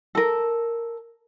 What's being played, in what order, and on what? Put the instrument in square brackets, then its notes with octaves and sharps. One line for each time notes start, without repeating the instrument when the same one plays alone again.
[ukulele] A4 A#4